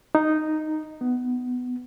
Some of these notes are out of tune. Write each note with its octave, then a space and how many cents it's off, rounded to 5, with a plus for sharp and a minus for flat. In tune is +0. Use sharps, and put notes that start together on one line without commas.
D#4 -5
B3 +10